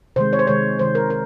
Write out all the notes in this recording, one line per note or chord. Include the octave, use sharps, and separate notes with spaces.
C3 D#3 G#3 C5
C#5
C5
C3 D#3 G#3 C#5
C3 D#3 G#3 C5
A#4
A#4